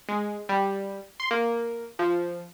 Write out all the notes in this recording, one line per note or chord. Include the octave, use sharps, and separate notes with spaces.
G#3
G3
C6
A#3
F3